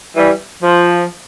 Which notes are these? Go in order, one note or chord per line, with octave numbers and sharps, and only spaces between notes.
E3 G3
F3